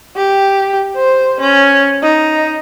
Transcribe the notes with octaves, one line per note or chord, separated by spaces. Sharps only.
G4
C5
C#4
D#4